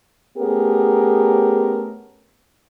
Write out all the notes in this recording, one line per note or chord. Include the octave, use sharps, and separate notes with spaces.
A3 B3 C#4 G4 G#4 A#4